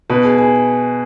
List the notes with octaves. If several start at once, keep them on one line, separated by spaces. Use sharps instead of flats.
B2 B4
G#4
G#4